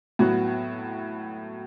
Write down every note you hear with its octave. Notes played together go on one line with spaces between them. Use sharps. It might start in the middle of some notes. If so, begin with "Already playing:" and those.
A2 F#3 B3 F#4